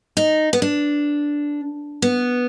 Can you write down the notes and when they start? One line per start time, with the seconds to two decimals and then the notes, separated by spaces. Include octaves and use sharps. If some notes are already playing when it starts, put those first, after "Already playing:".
0.17 D#4
0.53 B3
0.62 D4
2.02 B3